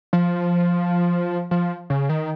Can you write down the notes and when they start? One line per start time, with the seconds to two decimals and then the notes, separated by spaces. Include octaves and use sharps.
0.13 F3
1.51 F3
1.90 C#3
2.09 D#3